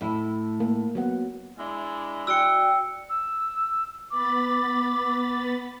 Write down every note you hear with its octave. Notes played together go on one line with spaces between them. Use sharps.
A2 E4
A#3
F#3 B3 F#5
G#3 D4 E4
F#4 D5 G5 E6 C#7
E6
B3 B5 D6 A6